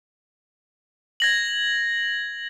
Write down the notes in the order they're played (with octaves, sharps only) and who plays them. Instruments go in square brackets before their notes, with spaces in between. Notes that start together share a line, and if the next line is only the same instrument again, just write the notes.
[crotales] G#6 A#6 F#7